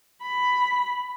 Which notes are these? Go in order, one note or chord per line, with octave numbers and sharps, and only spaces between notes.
B5